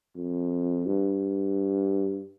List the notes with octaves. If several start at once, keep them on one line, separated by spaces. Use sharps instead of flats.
F2
G2